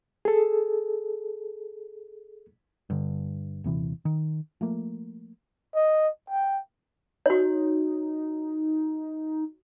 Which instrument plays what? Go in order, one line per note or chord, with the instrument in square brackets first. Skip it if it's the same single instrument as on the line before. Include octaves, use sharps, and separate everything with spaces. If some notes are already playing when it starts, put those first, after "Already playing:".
[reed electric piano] G#4 A4
[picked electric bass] G2 D3
D#1 C3 E3
D#3
F3 A3 A#3
[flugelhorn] D#5
G5
[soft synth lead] D#4 [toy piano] F#4 C#5